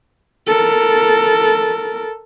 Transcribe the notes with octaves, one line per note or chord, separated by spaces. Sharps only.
A4 A#4